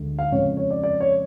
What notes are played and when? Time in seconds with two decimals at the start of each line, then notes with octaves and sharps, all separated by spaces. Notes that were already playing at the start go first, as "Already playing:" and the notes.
Already playing: D2 D3 G#3
0.19 F5
0.32 F2 C#3 G#3 C#5
0.57 C#5
0.71 D5
0.83 D5
1.00 C#5